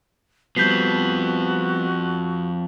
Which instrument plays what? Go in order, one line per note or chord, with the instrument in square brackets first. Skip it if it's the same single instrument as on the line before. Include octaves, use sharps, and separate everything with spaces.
[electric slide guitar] F3 C4 [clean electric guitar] G3 B3 [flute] F#4 [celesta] G6 B6 C7